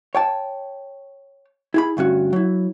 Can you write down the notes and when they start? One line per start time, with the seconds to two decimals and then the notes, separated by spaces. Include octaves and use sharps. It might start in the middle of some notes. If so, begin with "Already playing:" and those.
0.15 C#5 G5 A5
1.74 E4 G#4 B5
1.97 D2 G2 C#4 F#4
2.33 F#3 E4